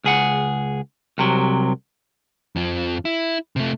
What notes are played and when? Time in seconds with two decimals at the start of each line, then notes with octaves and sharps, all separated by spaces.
0.04 C#2 G#4 F#5
1.18 C2 C3 F#3
2.56 F2 F3
3.05 E4
3.56 C3 A3